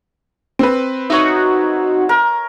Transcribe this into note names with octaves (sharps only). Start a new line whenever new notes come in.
C4 B4
D#4 F#4 C#5 E5
A#4